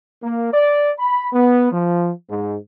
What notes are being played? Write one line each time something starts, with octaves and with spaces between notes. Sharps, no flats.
A#3
D5
B5
B3
F3
G#2